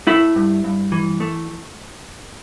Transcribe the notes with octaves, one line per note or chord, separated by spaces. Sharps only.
A3 E4
G2
G2
E3
A3